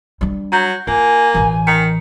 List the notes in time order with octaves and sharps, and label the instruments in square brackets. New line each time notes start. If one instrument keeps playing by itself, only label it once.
[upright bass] G3 D4
[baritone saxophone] F#3 [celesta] A#5 G6
[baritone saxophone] A#3 [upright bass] F4 [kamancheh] G#5
[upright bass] A1 E3
[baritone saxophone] D#3 [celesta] C#7